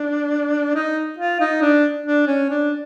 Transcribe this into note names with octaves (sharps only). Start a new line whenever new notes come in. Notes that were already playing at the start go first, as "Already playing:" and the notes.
Already playing: D4
D#4
F4
D#4
D4
D4
C#4
D4